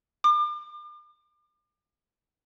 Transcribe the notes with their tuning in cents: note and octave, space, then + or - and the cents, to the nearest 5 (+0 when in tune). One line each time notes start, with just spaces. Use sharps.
D6 +40